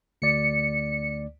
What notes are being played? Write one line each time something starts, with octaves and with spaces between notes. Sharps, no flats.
D2 D5 C#7